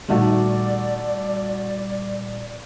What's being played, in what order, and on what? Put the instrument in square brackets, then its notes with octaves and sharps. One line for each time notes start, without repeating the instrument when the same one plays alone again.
[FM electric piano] A#2 G3 [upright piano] D#3 A3 F#4 [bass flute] D5